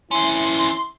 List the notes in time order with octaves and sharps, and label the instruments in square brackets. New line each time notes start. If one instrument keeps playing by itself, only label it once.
[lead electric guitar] E3 C#4 [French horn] E4 [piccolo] C6